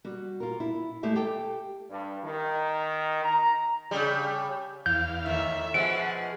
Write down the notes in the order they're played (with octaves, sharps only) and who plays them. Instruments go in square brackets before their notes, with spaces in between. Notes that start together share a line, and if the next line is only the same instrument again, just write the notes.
[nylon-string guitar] G3 F#4
F4 A#4
E4
G#3 A3 G4 E5
G4 A4 G5
[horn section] G2
D#3
A#5
[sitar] C#3 G3
[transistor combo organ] E2 F5 [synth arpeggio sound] G6
[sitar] A2 D#3 [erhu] E5
[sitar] B2 F3 G#3 [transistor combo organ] F#5 [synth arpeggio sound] D7